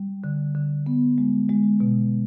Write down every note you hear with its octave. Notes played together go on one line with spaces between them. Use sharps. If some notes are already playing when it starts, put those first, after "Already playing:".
Already playing: G3
D3
D3
B3
G#3
G#3
B2